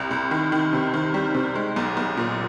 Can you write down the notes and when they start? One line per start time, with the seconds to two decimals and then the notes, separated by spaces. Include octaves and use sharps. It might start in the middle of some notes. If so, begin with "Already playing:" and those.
Already playing: C2
0.11 C2
0.31 D#3
0.52 D#3
0.73 C3
0.94 D#3
1.14 G3
1.35 C3
1.55 G#3
1.76 B1
1.97 B1
2.17 A#2